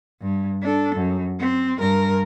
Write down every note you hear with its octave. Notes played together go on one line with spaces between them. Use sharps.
G2
D4 A4
F#2
C4
G2 A#4